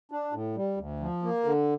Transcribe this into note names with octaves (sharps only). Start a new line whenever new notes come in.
D4
A2
G3
D2
F3
A#3
D3